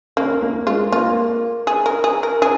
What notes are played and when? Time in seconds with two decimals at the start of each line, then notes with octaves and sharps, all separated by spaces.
0.17 A#3 C#4
0.42 A#3
0.67 G#3 F4
0.92 A#3 F4
1.67 G#4
1.86 A#4
2.04 G#4
2.23 A#4
2.42 C#4 G#4